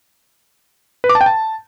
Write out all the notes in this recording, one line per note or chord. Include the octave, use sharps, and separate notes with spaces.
B4
D6
A5
G5
A5